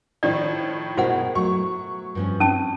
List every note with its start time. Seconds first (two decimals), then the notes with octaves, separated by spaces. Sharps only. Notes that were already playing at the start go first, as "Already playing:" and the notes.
0.23 A2 D#3 F3 D5
0.97 B2 G#3 F#4 A#4 C5 F#5
1.35 F#3 A3 C#6
2.15 G2 F3 C#4
2.40 C4 C#4 A5